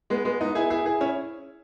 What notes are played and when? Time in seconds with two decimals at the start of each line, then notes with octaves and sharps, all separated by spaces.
0.10 G#3 B3
0.25 G#3 B3
0.41 B3 D#4
0.55 E4 G#4
0.70 E4 G#4
0.86 E4 G#4
1.01 C#4 E4